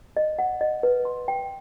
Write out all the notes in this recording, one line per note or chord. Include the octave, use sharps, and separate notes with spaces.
D#5
F#5
D#5
B4
C6
G5